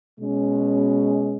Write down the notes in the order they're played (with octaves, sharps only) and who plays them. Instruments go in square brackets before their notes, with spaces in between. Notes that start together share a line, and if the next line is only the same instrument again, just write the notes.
[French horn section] B2 G#3 C#4